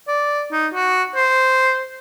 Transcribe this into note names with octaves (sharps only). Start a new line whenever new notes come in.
D5
D#4
F#4
C5